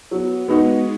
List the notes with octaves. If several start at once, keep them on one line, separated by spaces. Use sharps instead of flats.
F#3 B3
G#3 B3 D#4 F#4